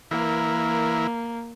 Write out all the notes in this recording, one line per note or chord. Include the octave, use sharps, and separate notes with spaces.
E3 A#3 E4 A#4